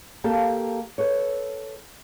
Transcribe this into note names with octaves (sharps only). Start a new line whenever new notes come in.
A#3 G4 A4 F5 A5
A4 B4 C#5